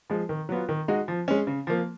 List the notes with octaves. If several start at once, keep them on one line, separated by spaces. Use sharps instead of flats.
F3 G#3
D#3
F#3 B3 F4
D#3
G#3 D#4 F#4
F3
G#3 C#4
C#3
F3 A#3